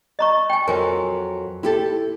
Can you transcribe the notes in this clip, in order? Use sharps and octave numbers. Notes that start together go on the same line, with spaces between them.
D#5 A#5 C#6
G5 G#5
F2 F#3 A#4 G#5
E4 G4 A4